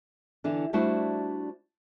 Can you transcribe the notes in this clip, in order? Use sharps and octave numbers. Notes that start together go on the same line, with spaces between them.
D3 E3 B3 D4
G3 A3 D4 E4 F#4 C5